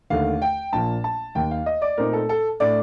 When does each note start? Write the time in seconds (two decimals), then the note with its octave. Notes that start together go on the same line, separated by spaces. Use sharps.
0.10 D#2 D3 A3 F5
0.42 G5
0.73 A#1 A#2 F3 A#3 A5
1.04 A5
1.35 D#2 D#3 A#3 G5
1.51 F5
1.66 D#5
1.82 D5
1.98 A#2 A3 C4 D#4 A#4
2.13 A4
2.29 A4
2.60 A2 A3 D4 D5